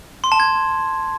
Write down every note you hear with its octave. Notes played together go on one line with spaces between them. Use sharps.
C6
A5
G#6